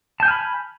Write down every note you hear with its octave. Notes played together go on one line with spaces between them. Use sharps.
G#5 A5 B5 F6 G6